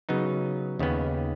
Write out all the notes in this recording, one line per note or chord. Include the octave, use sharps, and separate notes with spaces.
C#3 F#3 B3 D#4
D#2 C#3 B3